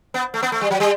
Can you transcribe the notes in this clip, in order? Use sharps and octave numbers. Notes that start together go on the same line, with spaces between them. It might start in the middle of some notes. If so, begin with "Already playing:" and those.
B3
A3
B3
A3
G3
F#3
G3